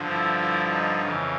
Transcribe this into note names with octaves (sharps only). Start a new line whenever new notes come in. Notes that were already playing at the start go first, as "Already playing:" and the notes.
Already playing: G2 D3 F3
E4
E4
D#4
F2 C#3 E3